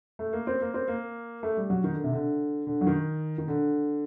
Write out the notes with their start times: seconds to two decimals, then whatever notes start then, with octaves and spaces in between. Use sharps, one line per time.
0.19 A3
0.33 A#3
0.47 C4
0.61 A#3
0.74 C4
0.88 A#3
1.43 A3
1.57 G3
1.70 F#3
1.84 D#3
1.94 D3
2.04 C3
2.13 D3
2.67 D3
2.81 F#3
2.87 D#3
3.38 D#3
3.48 D3